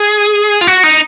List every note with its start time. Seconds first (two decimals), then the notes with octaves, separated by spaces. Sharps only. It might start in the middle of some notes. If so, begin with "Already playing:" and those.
Already playing: G#4
0.61 F4
0.67 F#4
0.84 D#4